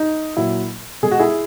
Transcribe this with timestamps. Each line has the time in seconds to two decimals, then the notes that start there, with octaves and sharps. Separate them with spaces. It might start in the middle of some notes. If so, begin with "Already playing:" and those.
Already playing: D#4
0.37 A#2 F#3 E4
1.03 B2 G#3 G#4
1.11 F#4
1.19 E4 G#4